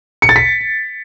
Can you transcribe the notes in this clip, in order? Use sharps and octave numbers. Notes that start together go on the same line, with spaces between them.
C#7
A6
B6